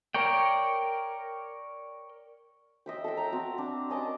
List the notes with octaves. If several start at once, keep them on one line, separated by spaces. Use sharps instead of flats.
A#4 C#5 D5 G5
D#5 E5 G5
A4 E5 G5
G5 A#5
C4 F#4
D4
C#4 D#5 A5 D6